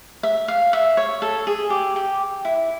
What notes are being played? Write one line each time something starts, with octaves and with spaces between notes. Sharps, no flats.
E5
F5
E5
C#5
A4
G#4
G4
G4
E4